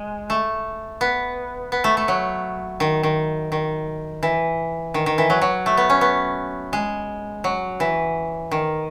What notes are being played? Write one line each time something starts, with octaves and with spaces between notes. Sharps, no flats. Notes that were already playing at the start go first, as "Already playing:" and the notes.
Already playing: G#3
A3
B3
B3
A3
A3
F#3
D#3
D#3
D#3
E3
D#3
D#3
E3
F#3
F#3
A3
B3
C#4
B3
G#3
F#3
E3
D#3